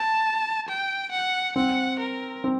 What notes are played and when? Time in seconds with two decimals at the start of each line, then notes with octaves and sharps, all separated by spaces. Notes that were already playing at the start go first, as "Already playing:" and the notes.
Already playing: A5
0.69 G5
1.12 F#5
1.56 C4 F#5
2.00 A#4
2.44 C4